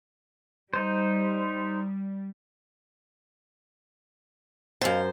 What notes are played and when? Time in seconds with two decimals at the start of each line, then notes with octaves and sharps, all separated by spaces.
0.74 G3 D#4 C5
4.81 F#2 B2 C4 C5 F5